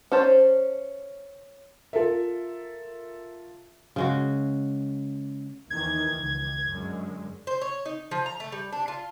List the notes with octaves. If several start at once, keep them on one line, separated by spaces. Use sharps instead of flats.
C#4 C5 A5
F4 A4 A#4 E5
C#3 G#3 F#4
D#2 D#3 E3 G#6
C#2
F#2 D3 G#3
C5
C#5
D#4
F3
A#5
A3
G3
D4
F4